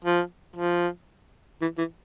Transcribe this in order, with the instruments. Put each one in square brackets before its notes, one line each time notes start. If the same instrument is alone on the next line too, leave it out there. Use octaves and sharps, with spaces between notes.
[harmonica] F3
F3
E3
E3